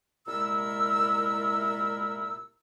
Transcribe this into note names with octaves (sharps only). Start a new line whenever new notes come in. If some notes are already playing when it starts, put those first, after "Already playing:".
C2 A#2 G#3 E4 A#4 E6